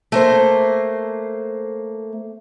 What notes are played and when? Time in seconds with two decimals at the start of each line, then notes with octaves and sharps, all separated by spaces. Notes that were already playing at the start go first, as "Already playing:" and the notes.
0.12 A3 A#3 C5